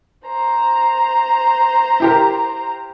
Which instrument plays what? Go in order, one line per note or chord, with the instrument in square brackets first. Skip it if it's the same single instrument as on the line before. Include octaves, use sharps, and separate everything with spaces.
[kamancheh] C5 A#5
[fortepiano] E4 G4 A#4